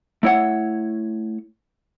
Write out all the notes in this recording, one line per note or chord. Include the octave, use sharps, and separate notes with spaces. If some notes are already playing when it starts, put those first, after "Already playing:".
A3 E4 C#5 F#5